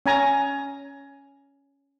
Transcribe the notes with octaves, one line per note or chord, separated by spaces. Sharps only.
C#4 G#5 A#5